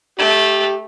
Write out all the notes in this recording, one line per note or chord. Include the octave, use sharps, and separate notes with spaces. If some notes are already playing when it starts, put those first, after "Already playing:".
A3 G4